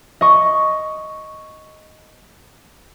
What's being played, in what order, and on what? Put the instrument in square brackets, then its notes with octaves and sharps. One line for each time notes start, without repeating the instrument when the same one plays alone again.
[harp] D#5 C#6